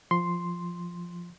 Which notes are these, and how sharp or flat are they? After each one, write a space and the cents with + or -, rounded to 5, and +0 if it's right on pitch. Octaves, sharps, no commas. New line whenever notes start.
F3 +0 C6 +0